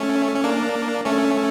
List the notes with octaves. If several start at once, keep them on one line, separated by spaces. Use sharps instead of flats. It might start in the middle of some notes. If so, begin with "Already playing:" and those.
Already playing: A3 C#4
C#4
A#3 D4
A3 C#4